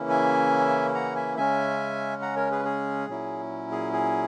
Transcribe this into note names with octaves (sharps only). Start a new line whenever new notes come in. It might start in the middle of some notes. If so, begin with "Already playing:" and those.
Already playing: C#3 E3 A#3 C#4 E4
E5 G#5
F#5 A#5
E5 G#5
C#3 G#3 C#4 E5 G#5
F#5 A#5
A#4 C#5
G#4 B4
G#4
A#2 F#3 C#4 E4
G#4
G#4